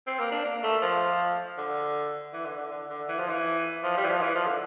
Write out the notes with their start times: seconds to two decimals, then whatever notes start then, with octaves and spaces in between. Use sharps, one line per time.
0.07 C4
0.19 A#3
0.32 D4
0.44 A#3
0.63 A3
0.82 F3
1.58 D3
2.33 E3
2.45 D3
2.58 D3
2.71 D3
2.89 D3
3.09 E3
3.19 F3
3.29 E3
3.84 F3
3.97 G3
4.05 E3
4.10 F3
4.21 E3
4.35 F3
4.47 D3